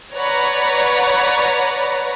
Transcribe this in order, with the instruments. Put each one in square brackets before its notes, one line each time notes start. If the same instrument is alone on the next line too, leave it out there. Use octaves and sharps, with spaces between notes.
[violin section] B4 C#5 D5 F#5 A#5 B5